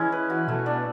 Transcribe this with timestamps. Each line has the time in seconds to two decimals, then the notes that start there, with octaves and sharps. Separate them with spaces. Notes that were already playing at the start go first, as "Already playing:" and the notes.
Already playing: E3 G#3 C#4 E4
0.12 B4
0.30 F#4
0.48 B2 A3
0.66 D4